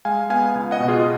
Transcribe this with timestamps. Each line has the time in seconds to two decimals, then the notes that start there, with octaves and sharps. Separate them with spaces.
0.05 G#3 F5 G#5
0.30 B3 F5 G#5
0.55 C#2
0.71 D#5 F#5
0.80 B2
0.88 F4 G#4